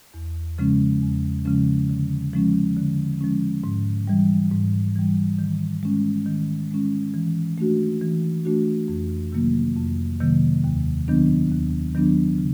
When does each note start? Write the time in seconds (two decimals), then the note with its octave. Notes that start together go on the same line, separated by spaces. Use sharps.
0.14 E2
0.58 C#3 F3 G#3 C#4
1.02 E2
1.45 C#3 F3 G#3 C#4
1.89 D3
2.33 F3 G#3 C#4
2.77 D3
3.21 F3 G#3 C#4
3.64 G#2
4.07 E3 G3
4.51 G#2
4.96 E3 G3
5.39 D#3
5.83 G#3 C#4
6.26 D#3
6.71 G#3 C#4
7.14 E3
7.58 A3 D4 F#4
8.02 E3
8.45 A3 D4 F#4
8.88 F2
9.32 C3 D#3 F#3 A#3
9.77 F2
10.20 C3 D#3 F#3 A#3
10.64 D#2
11.08 D#3 F#3 B3 D4
11.51 D#2
11.95 D#3 F#3 B3 D4
12.38 C#3